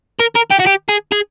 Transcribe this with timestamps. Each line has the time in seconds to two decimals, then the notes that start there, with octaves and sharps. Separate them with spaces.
0.19 A#4
0.35 A#4
0.50 G4
0.59 F#4
0.66 G4
0.89 G#4
1.12 G#4